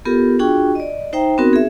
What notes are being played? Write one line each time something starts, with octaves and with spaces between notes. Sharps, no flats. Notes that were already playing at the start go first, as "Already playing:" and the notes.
B3 F4 G4 A4 A#4
D4 F4 F#4 G#4 G5 C#6
D5 D#5
D#4 C5 E5 G5 A#5
B3 C4 D#4 F#4 A#4
G#4 E5